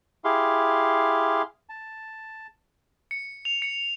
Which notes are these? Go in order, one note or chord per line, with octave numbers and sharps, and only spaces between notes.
E4 G4 G#4 F5 C6
A5
C#7
F7
C#7